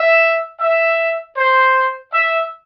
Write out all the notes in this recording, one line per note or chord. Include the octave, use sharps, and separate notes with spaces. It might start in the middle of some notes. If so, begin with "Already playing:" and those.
Already playing: E5
E5
C5
E5